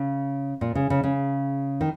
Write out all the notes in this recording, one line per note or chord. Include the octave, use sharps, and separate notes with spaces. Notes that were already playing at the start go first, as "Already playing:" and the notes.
Already playing: C#3
A#2
C#3
C#3
C#3
D#3